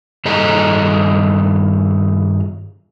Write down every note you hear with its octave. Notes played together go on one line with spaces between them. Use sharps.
G2 D#3 G#4 A4 D#5 A#5